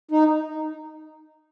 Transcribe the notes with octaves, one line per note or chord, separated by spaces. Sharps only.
D#4